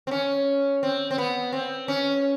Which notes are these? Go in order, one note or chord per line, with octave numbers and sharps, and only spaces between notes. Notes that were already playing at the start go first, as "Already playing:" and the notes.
C4
C#4
C4
C4
B3
C4
C#4